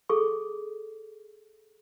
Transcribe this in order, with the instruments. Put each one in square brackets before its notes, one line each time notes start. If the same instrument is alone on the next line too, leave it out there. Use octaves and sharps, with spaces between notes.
[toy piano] G#4 A4 C#6